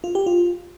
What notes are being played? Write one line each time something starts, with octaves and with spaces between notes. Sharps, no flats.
F4
G4
F4